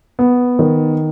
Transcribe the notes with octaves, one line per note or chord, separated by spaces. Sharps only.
B3
D#3